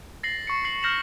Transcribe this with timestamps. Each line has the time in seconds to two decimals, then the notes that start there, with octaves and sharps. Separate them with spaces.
0.23 A6 A#6 C7 F#7
0.47 C#6 C#7
0.65 C7 F#7
0.83 F6 G6 A#6 C7 E7 F#7